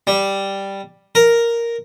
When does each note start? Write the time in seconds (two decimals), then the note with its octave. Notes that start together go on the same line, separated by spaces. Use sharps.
0.07 G3
1.15 A#4